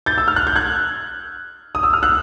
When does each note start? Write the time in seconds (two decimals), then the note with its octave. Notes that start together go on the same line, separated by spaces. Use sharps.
0.06 G6 A6
0.18 E6
0.28 F6
0.36 F#6
0.47 G6
0.55 F#6 G#6
1.75 D#6
1.83 E6
1.93 F6
2.03 E6 F#6